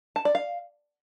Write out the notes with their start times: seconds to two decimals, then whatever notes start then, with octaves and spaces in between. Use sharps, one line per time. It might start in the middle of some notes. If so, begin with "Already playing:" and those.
0.16 A5
0.25 D5
0.35 F5